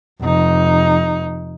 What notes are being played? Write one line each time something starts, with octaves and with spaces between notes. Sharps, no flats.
F1 D#4